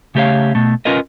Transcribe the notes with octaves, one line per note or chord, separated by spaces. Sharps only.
C#3 A3 G4 G#4 C#5 F5
B2 A3
C#4 F4 A#4 B4 D#5